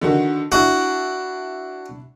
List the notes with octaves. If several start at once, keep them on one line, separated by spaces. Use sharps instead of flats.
D3 D#3 F#4
D4 E4 F#4